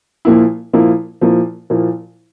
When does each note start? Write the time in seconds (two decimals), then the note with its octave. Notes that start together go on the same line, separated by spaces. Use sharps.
0.25 A#2 F3 A#3 E4
0.73 A#2 F3 A#3 E4
1.21 A#2 F3 A#3 E4
1.70 A#2 F3 A#3 E4